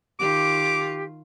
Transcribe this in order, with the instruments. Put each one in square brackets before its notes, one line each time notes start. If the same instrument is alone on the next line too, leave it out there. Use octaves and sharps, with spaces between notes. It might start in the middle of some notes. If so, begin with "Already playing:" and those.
[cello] D#3 F4 [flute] G4 [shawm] D6